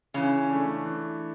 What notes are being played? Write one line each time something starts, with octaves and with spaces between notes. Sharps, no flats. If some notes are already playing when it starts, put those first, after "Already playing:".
C#3 E3 C#4
A3 D4
E3